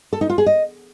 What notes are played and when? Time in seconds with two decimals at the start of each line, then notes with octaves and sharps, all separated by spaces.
0.13 A4
0.21 D#4
0.29 F4
0.38 G#4
0.46 D#5